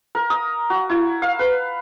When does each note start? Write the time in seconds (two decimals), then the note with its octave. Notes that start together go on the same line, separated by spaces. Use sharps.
0.15 A#4
0.30 D#6
0.70 F#4
0.90 E4
1.22 F5
1.39 B4